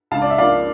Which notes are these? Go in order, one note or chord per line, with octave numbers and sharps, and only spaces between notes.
C#2 F5 A5
D5
E5
C#3 F3 A#3 D5 F5